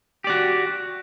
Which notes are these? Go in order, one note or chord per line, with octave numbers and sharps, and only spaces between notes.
F#4 G4 D5